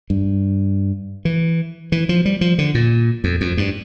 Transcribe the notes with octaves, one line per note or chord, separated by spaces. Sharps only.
G2
E3
E3
F3
G3
F3
D3
A#2
F2
F2
G2